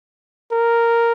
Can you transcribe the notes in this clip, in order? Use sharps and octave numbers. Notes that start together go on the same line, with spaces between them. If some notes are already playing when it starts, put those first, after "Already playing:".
A#4